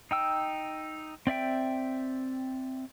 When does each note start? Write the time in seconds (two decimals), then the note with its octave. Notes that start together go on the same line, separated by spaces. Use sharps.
0.11 D#4 G5 E6
1.27 C4 D5 E5 G5